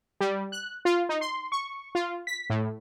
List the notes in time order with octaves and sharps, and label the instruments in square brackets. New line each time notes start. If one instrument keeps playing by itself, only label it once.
[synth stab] G3
F#6
F4
D#4
C6
C#6
F4
B6
A2